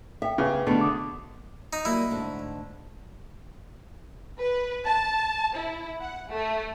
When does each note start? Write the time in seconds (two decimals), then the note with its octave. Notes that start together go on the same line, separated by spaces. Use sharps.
0.22 A4 E5 G5
0.38 C#3 B3 G#4
0.67 B2 D3 A3
0.81 D6 D#6
1.73 D#4
1.85 F#3 G3 A#3 E4
2.11 G#2 D3 A3
4.40 B4
4.87 A5
5.56 E4
6.00 F#5
6.30 A3